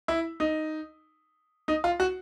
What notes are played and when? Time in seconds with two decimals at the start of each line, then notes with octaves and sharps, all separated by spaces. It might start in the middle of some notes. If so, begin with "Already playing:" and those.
0.08 E4
0.40 D#4
1.68 D#4
1.84 F4
2.00 F#4